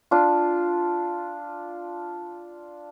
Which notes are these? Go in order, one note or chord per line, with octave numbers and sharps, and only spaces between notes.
D4 F4